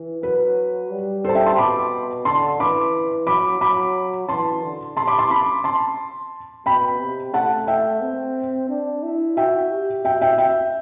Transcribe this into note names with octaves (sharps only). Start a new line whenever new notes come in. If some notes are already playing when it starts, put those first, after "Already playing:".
Already playing: E3
F#3 B4
G3
A4 C5
A5
E5 G5
A5 C6
B2 B5 D6
D3 A5 C6
E3 B5 D6
F#3 B5 D6
F#3 B5 D6
E3 A5 C6
D3
C3 A5 C6
B5 D6
A5 C6
B5 D6
A5 C6
B2 G5 B5
C3
A3 F#5 A5
E5 G5
C4
D4
E4
F#4 E5 G5
G4
F#4 E5 G5
E5 G5
E5 G5